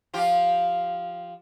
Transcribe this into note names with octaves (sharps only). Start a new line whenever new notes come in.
F3 F4 G4